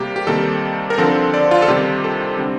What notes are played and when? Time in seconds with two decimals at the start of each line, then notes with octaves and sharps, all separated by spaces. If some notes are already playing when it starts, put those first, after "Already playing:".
Already playing: C3 G3 A#3 G4
0.16 G4
0.27 C3 D#3 G3 A#3 A4
0.90 A#4
0.98 D3 F3 C4 A4
1.34 D5
1.51 F4
1.62 A4
1.68 C3 D#3 G3 C4 G4
2.04 A4
2.38 D3 G3 C4